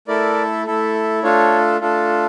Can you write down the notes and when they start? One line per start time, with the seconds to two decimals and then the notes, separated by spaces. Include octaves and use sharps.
0.08 A3 E4 A4 A#4 D5
0.66 A3 E4 A4
1.23 A3 D4 F4 A4 C#5
1.81 A3 D4 F4 A4